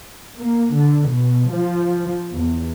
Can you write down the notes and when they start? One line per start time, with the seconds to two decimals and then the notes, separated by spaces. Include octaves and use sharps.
0.38 A#3
0.73 D3
1.08 B2
1.50 F3
2.31 E2